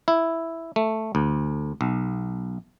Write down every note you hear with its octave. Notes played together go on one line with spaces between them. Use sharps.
E4
A3
D2
B1